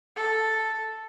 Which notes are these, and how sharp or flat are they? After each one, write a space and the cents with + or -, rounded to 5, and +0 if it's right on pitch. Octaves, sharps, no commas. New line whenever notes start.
A4 +0